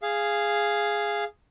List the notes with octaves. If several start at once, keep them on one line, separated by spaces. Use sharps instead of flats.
G#4 F5